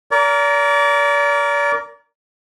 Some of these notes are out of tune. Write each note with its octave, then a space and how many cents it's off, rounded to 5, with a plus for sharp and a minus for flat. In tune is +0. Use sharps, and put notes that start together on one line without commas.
A#4 +5 D5 -35